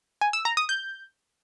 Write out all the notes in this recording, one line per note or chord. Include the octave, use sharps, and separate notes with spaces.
G#5
E6
A#5
D#6
G6